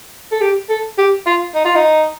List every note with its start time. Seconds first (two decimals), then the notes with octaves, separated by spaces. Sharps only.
0.31 A4
0.41 G4
0.69 A4
0.98 G4
1.26 F4
1.55 D#4
1.65 F4
1.75 D#4